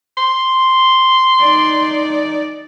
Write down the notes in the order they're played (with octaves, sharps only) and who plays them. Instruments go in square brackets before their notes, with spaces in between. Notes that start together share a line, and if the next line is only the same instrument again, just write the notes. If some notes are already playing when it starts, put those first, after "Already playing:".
[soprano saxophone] C6
[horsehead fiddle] D#4 D5